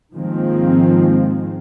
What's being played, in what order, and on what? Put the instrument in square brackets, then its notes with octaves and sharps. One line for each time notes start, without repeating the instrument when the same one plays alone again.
[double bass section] G#2 D#3 F3 G#3 A#3 C4